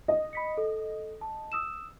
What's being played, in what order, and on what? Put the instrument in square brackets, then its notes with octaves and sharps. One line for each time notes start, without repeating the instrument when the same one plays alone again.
[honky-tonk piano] D#5
[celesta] B5 B6 C#7
A4
A5
D#6 E6 E7